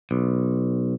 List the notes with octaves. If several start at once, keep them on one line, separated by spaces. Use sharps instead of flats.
B1